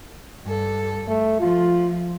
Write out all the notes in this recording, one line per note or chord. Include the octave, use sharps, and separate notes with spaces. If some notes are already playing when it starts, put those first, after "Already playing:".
G2 A4
A3
F3 F4